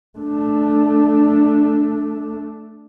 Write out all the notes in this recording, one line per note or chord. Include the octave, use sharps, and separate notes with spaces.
A3 D4